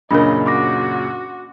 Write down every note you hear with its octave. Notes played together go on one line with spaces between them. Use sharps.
F#2 A#2 C#3 D4 A#4 D#5 B5
F#4 C6 D6 A#6